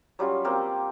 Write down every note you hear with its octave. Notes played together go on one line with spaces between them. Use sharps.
F#3 G3 C#4 F4
A#3 C4 F5 G5